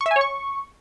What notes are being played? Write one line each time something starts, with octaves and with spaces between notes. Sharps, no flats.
C#6
E5
G#5
C#5
C#6